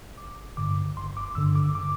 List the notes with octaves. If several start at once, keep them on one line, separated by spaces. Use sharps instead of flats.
G1 D6
G2 D3 D6
G1 C6
D6
G2 D3 E6
D6
D6